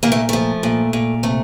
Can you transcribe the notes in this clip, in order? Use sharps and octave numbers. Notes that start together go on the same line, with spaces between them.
A#2 A#3
A3
F3 A3
A#2
A#2
C3 A3